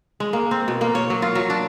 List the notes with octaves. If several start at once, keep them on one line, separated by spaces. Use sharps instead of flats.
G#3
A#3
C4
B2
A#3
C#5
F#3
F4
F#3
D4